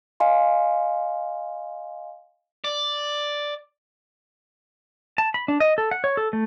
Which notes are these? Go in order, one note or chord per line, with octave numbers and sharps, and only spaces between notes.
D#5 F5 G#5 C6
D5
A5
B5
D4
D#5
A4
F#5
C#5
A4
A3